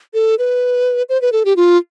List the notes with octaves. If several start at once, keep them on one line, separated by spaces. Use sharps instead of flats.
A4
B4
C5
B4
A4
G4
F4